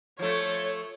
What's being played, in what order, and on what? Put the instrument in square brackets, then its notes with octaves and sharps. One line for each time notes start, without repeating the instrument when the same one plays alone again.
[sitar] F3 A3 [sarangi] C#5